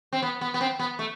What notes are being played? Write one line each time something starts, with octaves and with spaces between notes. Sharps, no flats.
C4
B3
B3
B3
C4
B3
A3